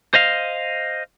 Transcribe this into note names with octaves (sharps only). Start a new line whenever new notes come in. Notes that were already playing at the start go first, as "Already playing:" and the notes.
C5 D#5 F5